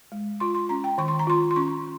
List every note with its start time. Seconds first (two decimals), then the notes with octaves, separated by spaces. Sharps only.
0.12 G#3
0.40 F4 C6
0.55 C6
0.69 C#4 A#5
0.84 G5
0.98 D#3 C#6
1.08 C6
1.19 A#5
1.27 F4 C6
1.51 C6
1.56 C#4 C#6